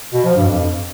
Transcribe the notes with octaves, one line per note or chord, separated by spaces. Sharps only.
B2
F3
G2
F2